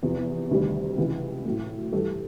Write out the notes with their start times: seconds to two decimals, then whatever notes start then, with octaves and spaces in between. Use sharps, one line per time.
0.02 E2 C3 F3
0.51 D2 C3 D#3 G3
0.98 C#2 C3 E3 G#3
1.45 A2 F#3 A3
1.92 G2 E3 G3 G4 A4